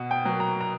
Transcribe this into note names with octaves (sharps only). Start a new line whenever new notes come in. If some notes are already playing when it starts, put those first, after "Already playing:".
Already playing: B2 F#5
G5
F#3 A#3
A#5
A#5